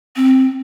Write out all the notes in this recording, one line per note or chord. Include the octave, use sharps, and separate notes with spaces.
C4